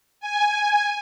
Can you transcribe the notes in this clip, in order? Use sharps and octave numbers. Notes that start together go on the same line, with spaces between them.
G#5